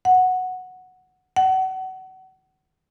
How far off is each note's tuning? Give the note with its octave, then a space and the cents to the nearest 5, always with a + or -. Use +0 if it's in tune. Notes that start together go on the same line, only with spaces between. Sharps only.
F#5 -5
F#5 +30